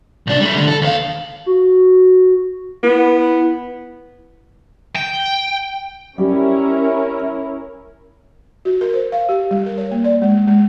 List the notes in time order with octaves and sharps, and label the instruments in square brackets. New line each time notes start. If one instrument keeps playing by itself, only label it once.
[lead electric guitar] C2 D4
G3 A3
D3
A4
D#2 F5
[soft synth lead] F#4
[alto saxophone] B3 [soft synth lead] E4
[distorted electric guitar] G5
[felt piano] G3 [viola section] C#4 E4 A#4
[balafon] F#4
A#4
C5
F5
G4
G3
A#4
C#5
A#3
D5
G#3
G#3